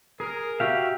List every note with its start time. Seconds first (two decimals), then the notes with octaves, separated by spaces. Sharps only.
0.20 G#4 A#4
0.60 F#4 G4 E5 F5